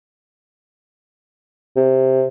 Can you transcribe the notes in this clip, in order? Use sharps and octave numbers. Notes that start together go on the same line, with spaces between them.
C3